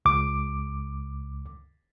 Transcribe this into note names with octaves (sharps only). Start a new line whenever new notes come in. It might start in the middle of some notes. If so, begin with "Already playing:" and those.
C#2 D6